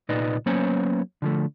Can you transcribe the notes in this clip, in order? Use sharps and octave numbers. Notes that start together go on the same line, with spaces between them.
C2 A#2 D#4 B4 D5 D#5
F#3 A#3 B3 C#4 C5 C#5
D3 F3 A3